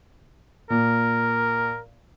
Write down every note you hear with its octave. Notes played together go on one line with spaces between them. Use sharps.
A#2 A#4